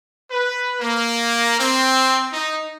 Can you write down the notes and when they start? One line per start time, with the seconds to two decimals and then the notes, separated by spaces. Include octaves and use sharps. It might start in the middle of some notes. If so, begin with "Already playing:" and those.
0.31 B4
0.81 A#3
1.60 C4
2.33 D#4